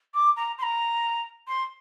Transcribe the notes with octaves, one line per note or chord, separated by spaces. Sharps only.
D6
A#5
C6
A#5
C6